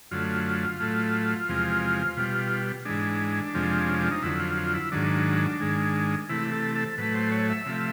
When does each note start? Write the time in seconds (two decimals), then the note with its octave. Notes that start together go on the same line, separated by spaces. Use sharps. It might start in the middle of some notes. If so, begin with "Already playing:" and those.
0.11 F#2 D3 F#3 A3 F4
0.80 A2 F#3 A3
1.48 E2 C3 F3 G#3
2.17 B2 G3
2.85 G#2 E3 G#3 D4
3.54 F2 C3 F3 G#3
3.87 C#4
3.99 D4
4.11 D#4
4.23 F2 D3 F#3 E4
4.40 F4
4.57 F4
4.74 E4
4.92 G#2 D#3 F#3 D4
5.60 G#2 D#3 G#3
6.29 C3 E3 A3 E4
6.52 A4
6.75 A4
6.98 A2 F#3 A3 B4
7.14 C5
7.32 C#5
7.50 E5
7.66 C3 F3 A3